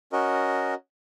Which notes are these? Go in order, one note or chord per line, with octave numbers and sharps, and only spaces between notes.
C#4 F#4 A#4 D#5